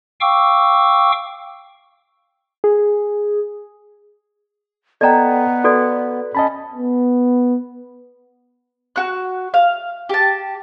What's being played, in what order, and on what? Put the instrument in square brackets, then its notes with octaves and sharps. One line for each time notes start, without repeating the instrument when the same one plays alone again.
[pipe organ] F5 G5 C#6 D6 E6
[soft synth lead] G#4
[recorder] B3 [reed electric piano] A4 G5 [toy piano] D5 D#5 A#5
[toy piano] F#4 A4 D5 [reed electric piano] B4
[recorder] C#4 [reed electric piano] D#5 A5 B5
[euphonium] B3
[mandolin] F#4 F#6
F5
G4 A5